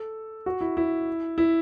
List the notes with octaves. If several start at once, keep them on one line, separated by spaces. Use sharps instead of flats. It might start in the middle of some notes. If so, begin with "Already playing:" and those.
Already playing: A4
F#4
E4
E4
E4